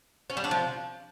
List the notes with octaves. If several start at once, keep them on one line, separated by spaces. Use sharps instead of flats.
C#4
G3
D4
F3